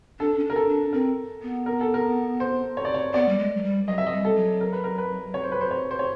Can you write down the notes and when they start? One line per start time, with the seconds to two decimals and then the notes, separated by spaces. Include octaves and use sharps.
0.19 D4 A4
0.39 C#4
0.44 D4
0.50 A#4
0.56 A4
0.68 D4
0.93 C4 A#4
1.42 B3
1.66 A#4
1.81 A4
1.94 A#4
2.40 C5
2.77 C#5
2.85 D5
2.94 C#5
3.14 B3 D5
3.29 G3
3.38 G#3
3.57 F#3
3.63 G3
3.87 F#3 D#5
3.98 E5
4.07 D#5
4.12 G3
4.25 A4
4.36 F#3
4.61 A#4
4.73 B4
4.84 A#4
4.98 B4
5.34 C#5
5.44 C5
5.52 B4
5.61 C5
5.71 C#5
5.91 C5
5.99 C#5